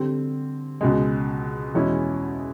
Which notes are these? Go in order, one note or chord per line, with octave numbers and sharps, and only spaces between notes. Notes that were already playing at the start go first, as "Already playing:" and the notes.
Already playing: D3 G3 C4
C#2 B2 G#3
E2 B2 G#3 C#4 E4